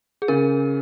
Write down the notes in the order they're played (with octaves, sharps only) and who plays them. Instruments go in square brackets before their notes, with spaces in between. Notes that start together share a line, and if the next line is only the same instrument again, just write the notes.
[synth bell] G#4
[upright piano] C#3 [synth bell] A#4